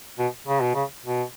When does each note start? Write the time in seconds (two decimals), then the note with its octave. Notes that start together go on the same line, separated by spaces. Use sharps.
0.19 B2
0.47 C#3
0.62 B2
0.75 C#3
1.05 B2